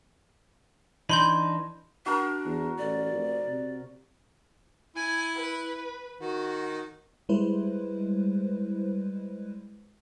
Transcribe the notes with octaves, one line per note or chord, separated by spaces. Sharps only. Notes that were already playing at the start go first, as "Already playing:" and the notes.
E3 D4 D#4 B5 C6 G6
D4 F#4 A#4
E2
A1 D5
F1
C3
E4 G#5
B4
D#3 F#4
G3 G#3 E4 B4 C5